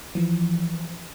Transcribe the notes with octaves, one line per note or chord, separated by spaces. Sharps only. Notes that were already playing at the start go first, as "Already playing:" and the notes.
E3 F3